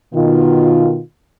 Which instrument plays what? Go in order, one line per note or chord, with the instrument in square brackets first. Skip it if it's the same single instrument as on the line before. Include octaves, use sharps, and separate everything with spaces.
[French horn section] B2 D#3 F4